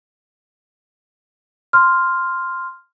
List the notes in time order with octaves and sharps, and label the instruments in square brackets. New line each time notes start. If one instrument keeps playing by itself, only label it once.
[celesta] C6 F6